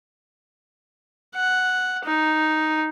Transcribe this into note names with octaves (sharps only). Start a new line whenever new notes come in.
F#5
D#4